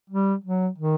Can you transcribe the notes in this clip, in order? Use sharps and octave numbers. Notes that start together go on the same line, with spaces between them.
G3
F#3
D#3